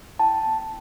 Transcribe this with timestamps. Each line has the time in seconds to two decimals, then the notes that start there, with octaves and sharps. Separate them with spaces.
0.19 E4 G5 A5
0.47 B3